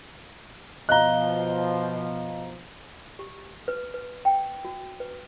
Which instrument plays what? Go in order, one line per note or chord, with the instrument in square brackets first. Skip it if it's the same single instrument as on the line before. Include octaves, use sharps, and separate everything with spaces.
[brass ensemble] B2 F3 [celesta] D#5 F5 G7 [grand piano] A#5 F#6
[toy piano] G4
B4
B4
G5
F#4
B4